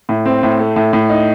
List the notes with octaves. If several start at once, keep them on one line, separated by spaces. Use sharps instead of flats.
A2
C4
A2
A3
A2
A2
D#4